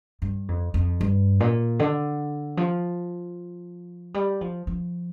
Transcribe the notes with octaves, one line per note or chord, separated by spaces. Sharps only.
G2
F2
F2
G2
A#2
D3
F3
G3
F3
F3